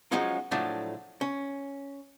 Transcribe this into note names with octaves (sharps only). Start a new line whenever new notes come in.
F3 F#3 G#3 C#4 D#4 F4
A2 F3 F#3 A3 D4
C#4